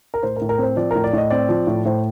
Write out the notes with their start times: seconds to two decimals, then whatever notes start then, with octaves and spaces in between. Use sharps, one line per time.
0.14 A#4
0.23 A2 C5
0.36 A#4
0.41 A2
0.49 A#4
0.58 C4 C5
0.76 F3 D5
0.91 A2 A#4
1.04 D5
1.13 A2 D#5
1.30 C4 D5
1.49 F3
1.67 A2
1.85 A2 C5